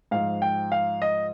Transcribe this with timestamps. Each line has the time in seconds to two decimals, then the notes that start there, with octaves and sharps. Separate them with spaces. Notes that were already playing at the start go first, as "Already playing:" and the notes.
0.11 G#2 F3 F5
0.42 G5
0.72 F5
1.02 D#5